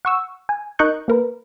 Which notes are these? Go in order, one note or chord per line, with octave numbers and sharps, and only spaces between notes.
F#5 C#6 E6
G#5
D#4 A#4 D#5 C#6 F#6 G6
A#3 A#4 B4